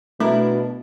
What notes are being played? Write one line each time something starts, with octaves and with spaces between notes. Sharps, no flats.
B2 A3 D4 E4 A#4